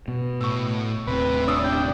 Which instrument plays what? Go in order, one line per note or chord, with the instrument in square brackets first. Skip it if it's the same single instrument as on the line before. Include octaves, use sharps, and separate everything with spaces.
[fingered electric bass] B2
[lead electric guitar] A2 [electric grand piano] C#6 E6
[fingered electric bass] D#1 A2 [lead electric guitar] C3 [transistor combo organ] B4
[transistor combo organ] C#4 D4 [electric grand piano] D5 D#6 E6
[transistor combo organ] D4 G5